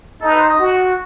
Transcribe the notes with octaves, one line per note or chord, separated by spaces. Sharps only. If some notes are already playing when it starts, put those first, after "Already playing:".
D#4 A4
B4
C5
D#5
F#4